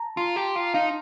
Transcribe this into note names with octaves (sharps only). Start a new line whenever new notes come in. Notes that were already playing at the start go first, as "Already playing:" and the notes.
Already playing: A5 A#5
F4 C6
G4 A#5
F4
D#4 F5